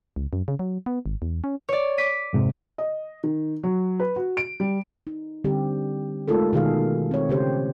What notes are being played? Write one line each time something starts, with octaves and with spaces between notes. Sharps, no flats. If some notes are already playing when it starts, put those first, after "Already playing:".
C#2
F#2
C#3
F#3
B3
G#1
E2
C#4
C#5 D5
D6 B6 D#7
F2 G#2 C3
D#5
D#3
F#3
B4
F#4
D7
G3
D#4
D3 G3 C4 G4
G#3 A3 D#4 F4 A4 A#4
B2 D#3 G#4 F5
C4 C#5
C#3 G4 C5